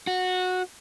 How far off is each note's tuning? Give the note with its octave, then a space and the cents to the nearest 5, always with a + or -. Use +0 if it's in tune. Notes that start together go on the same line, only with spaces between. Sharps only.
F#4 -15